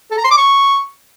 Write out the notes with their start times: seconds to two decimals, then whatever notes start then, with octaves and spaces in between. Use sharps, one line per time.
0.11 A4
0.18 A#5
0.24 C6
0.31 D6
0.38 C#6